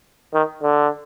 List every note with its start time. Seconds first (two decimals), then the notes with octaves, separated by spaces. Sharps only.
0.34 D#3
0.63 D3